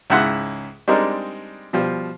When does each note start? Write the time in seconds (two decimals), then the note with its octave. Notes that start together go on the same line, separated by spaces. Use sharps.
0.10 C#2 G#2 E4 F#5 C6
0.88 G3 G#3 C4 D4 D#4 A#4
1.73 B2 F3 G3